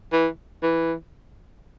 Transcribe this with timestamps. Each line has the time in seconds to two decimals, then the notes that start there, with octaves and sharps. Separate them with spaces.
0.12 E3
0.63 E3